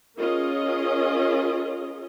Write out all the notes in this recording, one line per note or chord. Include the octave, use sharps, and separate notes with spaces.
C#4 F4 G#4 A#4 D#5